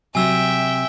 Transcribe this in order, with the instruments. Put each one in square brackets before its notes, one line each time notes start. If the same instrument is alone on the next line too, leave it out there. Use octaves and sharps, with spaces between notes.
[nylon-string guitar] C3 F#3 [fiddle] E5 G5 [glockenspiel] G#5 E6